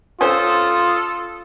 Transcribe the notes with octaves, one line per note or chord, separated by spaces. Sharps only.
C#4 F4 A4 C5 D#6